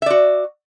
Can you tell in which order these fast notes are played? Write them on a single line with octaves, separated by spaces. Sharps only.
E5 D5 F#4